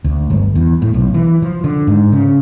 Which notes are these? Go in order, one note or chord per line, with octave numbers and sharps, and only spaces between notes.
D2
G1
E2
A2
B1
E3
F3
D3
G#2
C#3